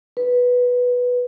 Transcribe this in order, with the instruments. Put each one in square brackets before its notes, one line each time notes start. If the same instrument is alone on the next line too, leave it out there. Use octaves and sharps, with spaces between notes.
[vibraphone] B4